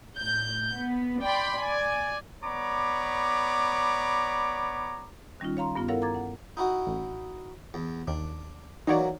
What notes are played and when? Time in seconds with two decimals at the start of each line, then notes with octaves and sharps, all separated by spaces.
0.16 A2 G6
0.73 B3
1.22 D5 G5 B5 C6
1.60 D5 G#5
2.44 B3 C#5 D5 A#5 B5 D6
5.40 D#3 G3 C#4 D#4 F4
5.57 C#5 F5 A#5 C6
5.75 G2 B3 F4
5.88 E4 A4 A#4 C#5 F5 F#5
6.02 A#5 D6 G#6 A6
6.14 F#5
6.57 D#4 E4 F#4
6.87 A1
7.74 E2
8.08 D#2 D4
8.87 E3 F#3 A#3 D#4 C#5 D5